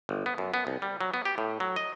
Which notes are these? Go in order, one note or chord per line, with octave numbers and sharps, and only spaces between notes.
G1
B3
F#2
B3
C2
G3
F#3
B3
G4
A2
F#3
D#5